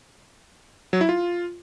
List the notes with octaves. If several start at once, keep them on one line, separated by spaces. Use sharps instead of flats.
F#3
E4
F4